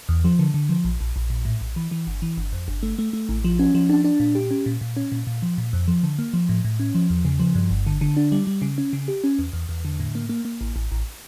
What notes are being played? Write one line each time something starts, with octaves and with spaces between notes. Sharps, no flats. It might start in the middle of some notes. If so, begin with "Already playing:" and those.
E2
F3
D3
D3
F3
A#1
A#1
A#1
A#2
A2
A#1
E3
E3
G1
E3
G1
F2
G1
A3
A3
A3
A1
F3
C#4
F3
D4
D4
A#2
G4
C#4
A#2
A#2
C#4
A#2
A#2
F3
A#2
F2
F3
D3
A#3
F3
A2
A2
C#4
F3
E2
C#3
F3
G2
G1
D3
D3
D4
G3
G3
C#3
C#4
C#3
G4
C#4
E2
E2
E2
D3
A2
A#3
A#3
A#3
A1
A1
A1